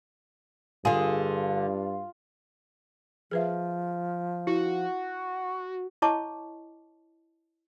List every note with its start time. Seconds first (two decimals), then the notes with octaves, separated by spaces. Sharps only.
0.85 G2 D3 F4 G#4
3.31 F3 G#4 B4 E5
4.47 E4 F#4
6.02 E4 C#5 D#5 A5 C#6 D6